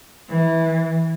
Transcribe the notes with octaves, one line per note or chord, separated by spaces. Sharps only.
E3